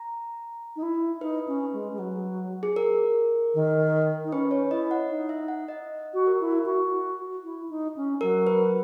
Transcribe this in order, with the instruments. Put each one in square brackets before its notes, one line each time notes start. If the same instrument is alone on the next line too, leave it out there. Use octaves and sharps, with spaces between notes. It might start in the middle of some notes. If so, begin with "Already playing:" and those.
Already playing: [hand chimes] A#5
[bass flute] D#4
E4
[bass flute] D#4 [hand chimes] B4
[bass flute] C#4
G#3
G#3
F#3
[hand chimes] G#4
A#4
[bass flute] D#3
D#4
[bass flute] C#4 [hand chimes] B4
[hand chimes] C#5
[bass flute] E4 [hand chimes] D#5
[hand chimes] F#5
[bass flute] D#4
[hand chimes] E5
F#5
D#5
[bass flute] F#4
[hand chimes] A#4
[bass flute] E4
F#4
E4
D#4
C#4
[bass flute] F#3 [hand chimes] A#4
[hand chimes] B4